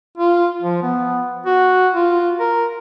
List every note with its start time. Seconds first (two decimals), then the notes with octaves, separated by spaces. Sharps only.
0.18 F4
0.62 F3
0.83 B3
1.46 F#4
1.93 F4
2.39 A#4